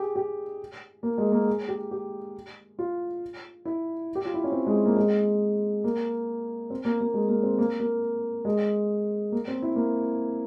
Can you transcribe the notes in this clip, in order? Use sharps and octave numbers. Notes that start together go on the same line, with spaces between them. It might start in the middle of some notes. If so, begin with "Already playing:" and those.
Already playing: G4 G#4
G4
A#3
G#3
A#3
G#4
G4
G4
F4
E4
G4
F4
E4
C#4
C4
G#3
A#3
G#3
A#3
C4
A#3
A#3
G#3
A#3
C4
A#3
A#3
G#3
A#3
C4
E4
A#3